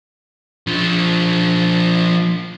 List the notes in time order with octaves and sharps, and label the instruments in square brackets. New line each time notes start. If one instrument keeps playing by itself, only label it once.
[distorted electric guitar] F3 D4